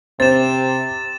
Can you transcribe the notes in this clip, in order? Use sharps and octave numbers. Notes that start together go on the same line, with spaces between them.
C3 C4 A6 E7